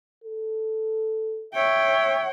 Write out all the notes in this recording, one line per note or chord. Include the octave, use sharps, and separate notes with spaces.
A4
C#5 E5 G5